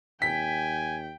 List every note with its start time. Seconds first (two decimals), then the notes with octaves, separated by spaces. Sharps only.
0.22 D#2 G5 G#5 B6